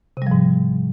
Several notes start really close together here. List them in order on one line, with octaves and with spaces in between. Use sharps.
C3 G3 F3 G#2